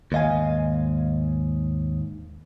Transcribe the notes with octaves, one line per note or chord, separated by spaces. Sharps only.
D#2 G#2 D#5 F5 G#5